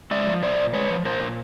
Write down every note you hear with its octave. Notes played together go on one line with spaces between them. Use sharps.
G#3 D5 E5
F3
A#2 C5 D5
A#2
G#3 B4 C#5
F3
A#2 A#4 C5
A#2